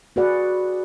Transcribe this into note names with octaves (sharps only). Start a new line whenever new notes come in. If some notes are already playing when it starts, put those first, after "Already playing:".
F#4 G#4 B4 D5 F#5